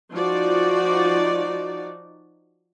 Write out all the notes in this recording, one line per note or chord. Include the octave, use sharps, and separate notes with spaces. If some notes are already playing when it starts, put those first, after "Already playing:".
F3 D#4 F#4 D5